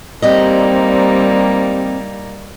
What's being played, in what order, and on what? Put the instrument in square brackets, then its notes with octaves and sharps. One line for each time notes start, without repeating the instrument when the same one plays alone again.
[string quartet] G3 A#3 D#4 [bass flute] C4 [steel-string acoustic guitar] G4 D5 D#5